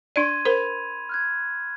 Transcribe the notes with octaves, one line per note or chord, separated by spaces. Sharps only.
D4 D5 C6 G#6 D#7
A#4 C5 B5 F7
F6 F#6 G#6